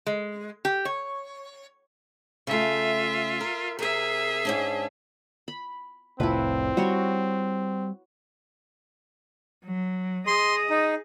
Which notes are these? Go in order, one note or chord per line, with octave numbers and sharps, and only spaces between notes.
G#3
G4
C#5
C#3 A3 F4 E5
A#4
C3 G#4 A#4 E5
G#2 C#4 D4
B5
F1 C2 A2 C4 E4 F4 B4
G3 F#4 C#5 C6
F#3
G#4 D#5 C6
D#4